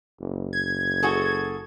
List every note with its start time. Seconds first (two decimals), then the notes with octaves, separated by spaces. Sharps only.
0.21 F#1
0.53 G#6
1.03 F#4 G#4 A4